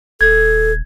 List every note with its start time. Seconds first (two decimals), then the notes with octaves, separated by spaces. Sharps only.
0.21 D#1 A4 G#6